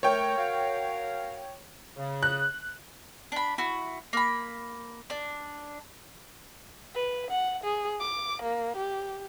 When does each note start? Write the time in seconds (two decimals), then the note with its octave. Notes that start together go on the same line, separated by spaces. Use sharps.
0.03 A3 A#4 C#5 G5
0.38 F#4 A#4 F5
1.97 C#3
2.23 F#6
3.32 D4 B5
3.58 E4 F#4
4.13 A#3 B5
5.10 D4
6.95 B4
7.31 F#5
7.63 G#4
8.00 D6
8.42 A#3
8.76 G4